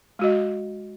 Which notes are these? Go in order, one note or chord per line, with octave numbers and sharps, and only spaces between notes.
G#3 F#4 D#5